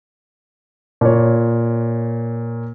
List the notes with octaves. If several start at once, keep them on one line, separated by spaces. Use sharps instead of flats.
A#2 C#5